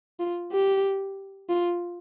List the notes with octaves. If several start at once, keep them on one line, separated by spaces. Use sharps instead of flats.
F4
G4
F4